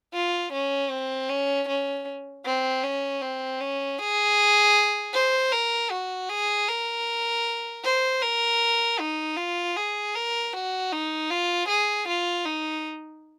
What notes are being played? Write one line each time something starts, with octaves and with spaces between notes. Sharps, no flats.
F4
C#4
C4
C#4
C#4
C4
C#4
C4
C#4
G#4
C5
A#4
F#4
G#4
A#4
C5
A#4
D#4
F4
G#4
A#4
F#4
D#4
F4
G#4
F4
D#4